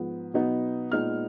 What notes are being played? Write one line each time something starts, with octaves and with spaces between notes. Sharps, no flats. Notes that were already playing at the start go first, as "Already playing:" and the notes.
Already playing: G#2 F3 B3
B2 F#3 B3 D#4
A#2 G#3 B3 D#4 F6